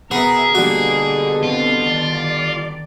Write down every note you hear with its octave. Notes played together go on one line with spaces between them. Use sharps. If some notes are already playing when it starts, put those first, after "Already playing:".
B2 B3 G#4 A#4 E5
B2 D3 G3 A#3 F#4
C4 F4
D#3 D5